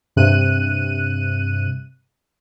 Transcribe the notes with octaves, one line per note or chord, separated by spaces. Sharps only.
G2 C3 F#6 D#7